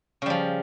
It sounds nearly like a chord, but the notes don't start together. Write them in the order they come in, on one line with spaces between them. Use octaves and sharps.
C#3 G3 F3